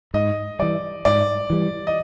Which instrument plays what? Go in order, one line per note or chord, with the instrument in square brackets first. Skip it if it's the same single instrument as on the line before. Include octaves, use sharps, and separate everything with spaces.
[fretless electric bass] G#2 [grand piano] D#5
[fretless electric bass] E3 G3 [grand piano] D5
[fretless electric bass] G#2 [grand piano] D5
[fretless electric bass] E3 G3
[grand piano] D#5